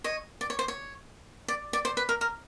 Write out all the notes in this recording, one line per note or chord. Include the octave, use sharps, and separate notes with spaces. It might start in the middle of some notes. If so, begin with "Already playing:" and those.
C#5 D#5
D5
C#5
C5
C#5
D5
D5
C5
B4
A#4
A#4